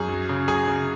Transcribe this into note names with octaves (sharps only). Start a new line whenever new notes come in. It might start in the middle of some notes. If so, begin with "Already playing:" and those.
Already playing: F#2 G#4 G#5
F#3
C#3
F#3 G#4 G#5
C#3